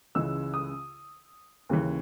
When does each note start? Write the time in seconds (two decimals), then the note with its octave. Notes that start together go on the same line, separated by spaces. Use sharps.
0.15 C#2 C#3 E3 G#3 E6
0.54 D#6
1.69 D#2 C#3 E3